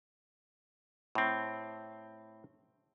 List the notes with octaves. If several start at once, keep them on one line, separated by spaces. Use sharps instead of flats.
A2 C4